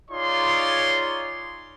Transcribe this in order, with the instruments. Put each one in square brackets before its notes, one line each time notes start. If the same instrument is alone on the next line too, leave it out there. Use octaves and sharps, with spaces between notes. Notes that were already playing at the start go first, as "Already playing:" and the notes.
[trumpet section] D#4 F4 G#4 C#5 D5 C6